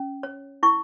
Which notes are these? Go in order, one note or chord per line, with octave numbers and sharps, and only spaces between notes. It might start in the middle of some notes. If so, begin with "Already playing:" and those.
Already playing: C#4
C#5
E4 C#6